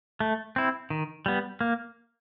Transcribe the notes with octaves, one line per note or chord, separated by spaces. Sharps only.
A3
C4 E4
D#3
G3 B3
A#3